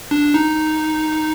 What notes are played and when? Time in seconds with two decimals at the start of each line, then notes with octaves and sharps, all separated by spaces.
0.11 D4
0.34 D#4